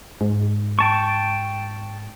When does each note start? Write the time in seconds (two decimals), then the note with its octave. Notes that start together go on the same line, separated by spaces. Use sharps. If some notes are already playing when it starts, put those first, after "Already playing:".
0.21 G#2
0.79 G5 A5 C#6